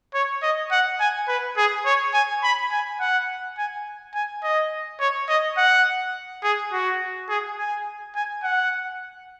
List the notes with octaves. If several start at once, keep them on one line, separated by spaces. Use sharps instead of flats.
C#5
D#5
F#5
G#5
B4
G#4
C#5
G#5
B5
G#5
F#5
G#5
G#5
D#5
C#5
D#5
F#5
G#4
F#4
G#4
G#5
G#5
F#5